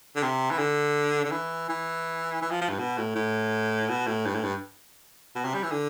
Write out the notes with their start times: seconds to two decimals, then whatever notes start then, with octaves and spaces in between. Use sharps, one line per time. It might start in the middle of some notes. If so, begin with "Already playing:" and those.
0.16 D3
0.23 C3
0.51 E3
0.58 D3
1.25 D3
1.32 E3
1.69 E3
2.42 E3
2.51 F3
2.61 F3
2.69 G2
2.79 B2
2.98 A2
3.16 A2
3.89 B2
4.07 A2
4.26 G2
4.35 A2
4.44 G2
5.36 B2
5.45 C3
5.54 G3
5.63 E3
5.72 D3